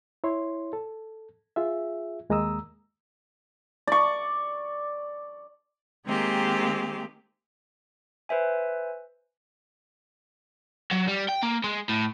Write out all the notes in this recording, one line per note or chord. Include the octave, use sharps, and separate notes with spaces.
E4 C#5 C6
A4
F4 G#4 E5
D#2 G#3 A#3 A#5 D#6 E6
D5 C#6
D#3 G#3 A#3 C4 G4 G#4
B4 C5 E5 G#5
F#3
G3
G5
A#3
G#3
A2